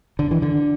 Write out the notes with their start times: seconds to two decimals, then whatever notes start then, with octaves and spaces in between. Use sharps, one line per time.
0.19 D3
0.31 E3
0.42 D3